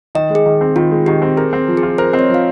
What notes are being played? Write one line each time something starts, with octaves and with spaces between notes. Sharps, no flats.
D#3 D#5
G#3
G#4
D#3
C4
D#3 F4
G#3
D#3 G4
C4
G#4 A#4
C4
F3
G#4
F4
A#4 C5
C4 D#5
C#5
F3
F5